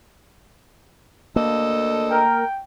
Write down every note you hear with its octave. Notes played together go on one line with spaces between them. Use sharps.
D2 A#3 A4 D#5
A#4 G5